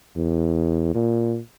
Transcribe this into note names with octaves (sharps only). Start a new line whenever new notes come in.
E2
A#2